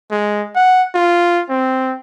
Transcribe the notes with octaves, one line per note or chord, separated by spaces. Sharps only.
G#3
F#5
F4
C4